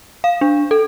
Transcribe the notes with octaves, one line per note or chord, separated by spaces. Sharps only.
F5
D4
A4